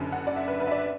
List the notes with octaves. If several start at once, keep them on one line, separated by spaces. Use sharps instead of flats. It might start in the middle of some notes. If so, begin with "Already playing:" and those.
Already playing: F#1 F#2 D3
F#5
D5
E5
B4
B4
E5
D5